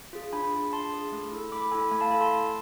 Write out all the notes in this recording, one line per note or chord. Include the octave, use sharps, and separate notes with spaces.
F4 G#4
D4 G#5 B5
F4 G#4
D4 A5 C6
F4 G#4
A3
E4 A4
A3 B5 D6
E4 A4 G#5 B5
A3 G#5 B5
F5 A5
E4 A4 G#5 B5
A5 C6
A3